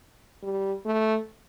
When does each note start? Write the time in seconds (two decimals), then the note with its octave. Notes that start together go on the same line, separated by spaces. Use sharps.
0.43 G3
0.85 A3